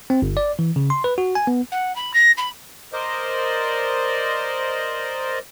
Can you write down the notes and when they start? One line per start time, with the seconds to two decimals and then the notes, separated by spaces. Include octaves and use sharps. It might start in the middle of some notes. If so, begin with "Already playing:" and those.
0.10 C4
0.22 G1
0.37 D5
0.59 E3
0.76 C#3
0.90 C6
1.04 B4
1.18 F#4
1.35 G#5
1.47 B3
1.72 F#5
1.96 B5
2.14 A#6
2.37 B5
2.93 A#4 C5 D5 D#5